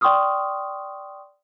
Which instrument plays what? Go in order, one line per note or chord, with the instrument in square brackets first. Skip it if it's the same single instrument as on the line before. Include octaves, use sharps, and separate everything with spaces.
[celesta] D5 G5 C6 C#6 D#6 F6